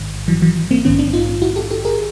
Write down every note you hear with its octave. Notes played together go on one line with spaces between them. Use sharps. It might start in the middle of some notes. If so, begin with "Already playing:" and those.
Already playing: A1 G#2 D#3
E3 F#3
E3 F#3
A#3 C4
A#1 G#2 D#3 B3 C#4
C4 D4
D#4 F4
E4 F#4
G4 A4
G4 A4
G#4 A#4